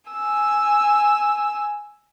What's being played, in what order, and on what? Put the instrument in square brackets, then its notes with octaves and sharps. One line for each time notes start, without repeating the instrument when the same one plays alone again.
[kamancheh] G#5 E6